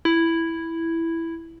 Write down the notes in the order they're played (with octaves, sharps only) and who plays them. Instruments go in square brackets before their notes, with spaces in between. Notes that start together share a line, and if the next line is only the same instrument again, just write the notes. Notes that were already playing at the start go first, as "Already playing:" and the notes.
[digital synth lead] E4